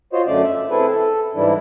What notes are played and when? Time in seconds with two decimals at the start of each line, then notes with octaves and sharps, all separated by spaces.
0.13 F4 F#4 C5 C#5 D#5
0.27 F#2 D3 A3 C#4 D5
0.43 E5
0.70 C4 E4 G#4 A4 B4
0.89 A4
1.35 G#2 E3 G3 D4 E4